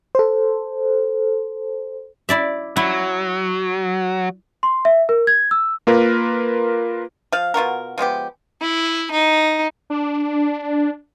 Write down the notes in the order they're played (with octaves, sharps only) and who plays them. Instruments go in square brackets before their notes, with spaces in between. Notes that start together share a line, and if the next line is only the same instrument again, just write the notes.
[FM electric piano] A4 C5
[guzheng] E4 D5 E5
[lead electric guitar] F#3 [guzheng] E4
[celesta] C6
E5
A#4
G#6
E6
[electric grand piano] A#3 F4 A#4 B4
[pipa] F3 F5
B2 F4 F#4 A#4
F3 G#3 B3 G4
[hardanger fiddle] E4
D#4
[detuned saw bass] D4